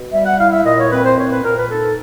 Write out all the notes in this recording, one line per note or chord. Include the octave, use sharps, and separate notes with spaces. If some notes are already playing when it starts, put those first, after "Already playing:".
Already playing: B2
G3 E5
F#5
E4 F5
E5
A#2 D#5
C#5
C4 B4
C5
A#2 C#5
B4
A#2 A#4
B4
D#4 A4